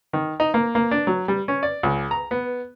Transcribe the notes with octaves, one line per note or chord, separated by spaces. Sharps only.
D#3
D#4
A#3
A#3
D4
F#3
G3
C#4
D5
C#2
A#5
B3